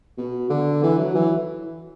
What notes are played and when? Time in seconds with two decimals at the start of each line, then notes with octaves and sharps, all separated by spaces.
0.18 B2
0.50 D3
0.83 E3
0.98 F#3
1.15 E3